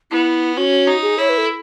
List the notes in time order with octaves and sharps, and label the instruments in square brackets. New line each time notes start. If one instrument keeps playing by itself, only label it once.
[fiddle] B3 [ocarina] E4
[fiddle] C#4 [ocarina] F#4
[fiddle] D#4
[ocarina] G#4
[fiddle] E4 [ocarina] C#5
[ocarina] B4
A4